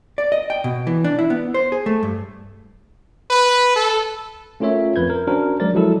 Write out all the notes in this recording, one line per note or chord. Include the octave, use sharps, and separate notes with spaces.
D5
D#5
G5
B2
E3
D4
E4
B3
C5
G#4
A3
G2
B4
A4
A3 C#4 F4 A#4 C#5 E5
F2 B4 G6 G#6
A#4
C#4 D4 F#4 A#4 C5
F#3 G#3 A#4 D5 A6
F3 F#3 G#3 E4 A4 E6